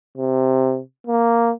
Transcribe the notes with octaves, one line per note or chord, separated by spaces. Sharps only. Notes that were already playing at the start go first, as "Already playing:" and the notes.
C3
A#3